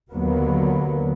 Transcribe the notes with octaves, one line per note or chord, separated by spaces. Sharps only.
D#2 D3 F#3 A#3 B3